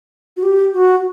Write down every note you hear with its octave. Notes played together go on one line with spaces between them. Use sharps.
F#4
G4
F#4